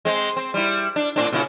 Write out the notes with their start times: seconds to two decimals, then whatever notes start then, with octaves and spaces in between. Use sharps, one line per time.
0.05 G#3 C4
0.37 C4
0.54 G3 E4
0.96 D4
1.16 A2 C4 D4
1.32 A#2 C#3 E4